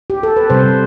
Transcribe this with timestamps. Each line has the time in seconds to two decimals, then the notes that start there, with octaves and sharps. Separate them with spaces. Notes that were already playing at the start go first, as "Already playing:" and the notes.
0.10 G4
0.23 A4
0.37 B4
0.50 C3 G3 C5